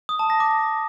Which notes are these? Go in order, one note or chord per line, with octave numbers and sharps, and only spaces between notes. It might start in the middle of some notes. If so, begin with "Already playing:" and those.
D#6
A5
A#6
D6